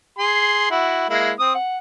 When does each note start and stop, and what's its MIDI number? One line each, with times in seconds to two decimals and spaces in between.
0.19 0.68 68
0.19 0.68 84
0.71 1.05 64
0.71 1.05 66
1.10 1.31 56
1.10 1.31 58
1.10 1.31 64
1.39 1.54 60
1.39 1.54 87
1.55 1.78 78